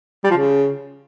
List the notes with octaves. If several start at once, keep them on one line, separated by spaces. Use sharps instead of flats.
G3
F3
C#3